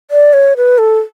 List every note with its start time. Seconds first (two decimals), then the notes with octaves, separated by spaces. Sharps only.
0.11 D5
0.33 C#5
0.57 B4
0.78 A4